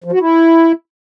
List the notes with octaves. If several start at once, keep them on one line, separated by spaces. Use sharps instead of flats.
F3
F#4
E4